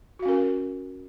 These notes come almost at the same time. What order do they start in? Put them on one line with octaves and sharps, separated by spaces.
F#4 F5 C#4 A#4